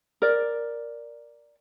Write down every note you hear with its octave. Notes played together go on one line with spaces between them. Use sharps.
A#4 D5